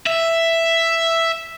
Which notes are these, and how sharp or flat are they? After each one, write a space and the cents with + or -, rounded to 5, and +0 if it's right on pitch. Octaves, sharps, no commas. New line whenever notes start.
E5 +5